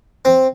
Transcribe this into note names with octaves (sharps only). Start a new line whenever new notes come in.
C4